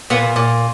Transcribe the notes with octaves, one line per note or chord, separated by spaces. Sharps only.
A#2 B3
A#2